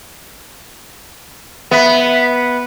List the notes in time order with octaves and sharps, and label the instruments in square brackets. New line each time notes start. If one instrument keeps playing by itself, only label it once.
[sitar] B3 [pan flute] E5